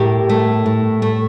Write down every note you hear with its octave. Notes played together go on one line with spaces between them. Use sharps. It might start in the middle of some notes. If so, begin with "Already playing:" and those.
Already playing: A2 G4 A#4
A3
A2
A3